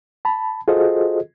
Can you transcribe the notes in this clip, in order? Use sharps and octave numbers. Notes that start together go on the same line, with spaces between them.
A5 B5
F4 F#4 G#4 A4 C5 D#5